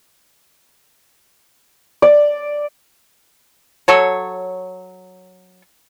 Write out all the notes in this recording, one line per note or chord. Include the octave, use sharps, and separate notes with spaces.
D5
F#3 A4 C#5